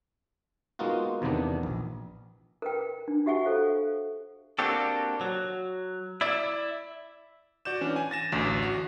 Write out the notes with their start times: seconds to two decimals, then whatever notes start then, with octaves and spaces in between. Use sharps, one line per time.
0.79 G#3 A#3 B3 D#4 F4 F#4
1.22 E2 C3 D#3 B3 D4
1.63 A#1
2.62 A#4 B4 G5
3.08 D4
3.26 F#4 G4 E5 F#5 G#5 C#6
3.45 A4 C5 F5
4.59 A#3 C4 D4 F#4 G4 A4
5.21 F#3
6.21 E4 D5 E5
7.65 F#4 D5 G6 E7
7.81 E3 C#4 D4
7.96 G#5
8.11 A6 A#6 E7
8.32 A1 D2
8.63 F#4